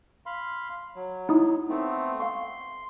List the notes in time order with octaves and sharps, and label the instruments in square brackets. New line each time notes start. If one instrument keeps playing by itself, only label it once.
[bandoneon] F5 B5 C6
F#3
[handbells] D#4 E4 D#6
[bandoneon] A3 B3 C4
[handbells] F5 C#6 [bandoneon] C6